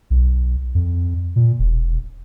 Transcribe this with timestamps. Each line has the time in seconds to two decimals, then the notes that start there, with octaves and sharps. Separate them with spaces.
0.10 B1
0.75 F2
1.36 A#2
1.59 E1